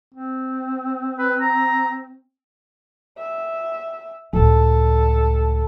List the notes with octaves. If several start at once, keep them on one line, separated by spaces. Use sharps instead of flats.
C4
B4
A#5
E5
C#2 A2 A4